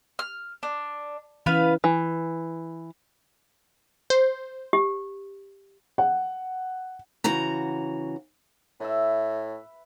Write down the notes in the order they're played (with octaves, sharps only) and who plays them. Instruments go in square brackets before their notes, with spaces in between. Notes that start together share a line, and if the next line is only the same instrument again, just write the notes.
[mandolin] F6
D4
[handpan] E3 C#4 [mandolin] B3 B4 F5
[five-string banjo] E3
[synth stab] C5
[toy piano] G4
[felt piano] F#5
[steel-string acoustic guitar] C#3 E3 F#4 A#5
[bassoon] A2 [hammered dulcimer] B4 E5